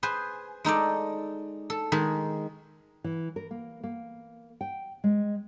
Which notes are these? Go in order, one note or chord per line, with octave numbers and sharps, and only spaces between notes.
G#4 B4 C5 G#5
G#3 D#4 A4 D5
A4
D#3 G#3 G#4
E3
A#4
A#3
A#3
G5
G#3